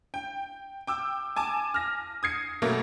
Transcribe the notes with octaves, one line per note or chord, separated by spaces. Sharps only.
G5
G5 D6 E6
G#5 A5 D6
F6 A#6
D#6 G#6 C7 C#7
B2 F#3 A3 A#3